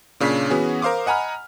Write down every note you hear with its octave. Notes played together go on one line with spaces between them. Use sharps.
A#2 C#3 D4 C#5 B6
E3 B3 C#4 F#4 G#4
A#4 C5 F5 C6 D6 D#6
D#5 F#5 G#5 A#5 B5 F6